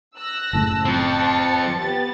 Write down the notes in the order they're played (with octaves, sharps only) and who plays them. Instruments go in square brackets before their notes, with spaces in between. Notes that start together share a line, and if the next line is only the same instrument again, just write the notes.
[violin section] E6 F#6 A#6
[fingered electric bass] F#1 A2 C#3 [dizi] A5
[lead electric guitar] F3 C4 [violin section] C5 A6 C#7
[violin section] B3 G4 A6